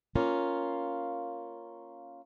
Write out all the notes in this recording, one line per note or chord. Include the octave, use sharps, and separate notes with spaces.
A#3 C#4 F4